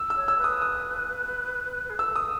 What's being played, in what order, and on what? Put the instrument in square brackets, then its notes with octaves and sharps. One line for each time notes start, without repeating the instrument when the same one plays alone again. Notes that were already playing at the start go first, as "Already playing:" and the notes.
Already playing: [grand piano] E6
E6
[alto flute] C#5
[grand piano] E6
[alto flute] B4
[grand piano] D#6
D#6
[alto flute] G#4
[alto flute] A4 [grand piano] E6
[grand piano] D#6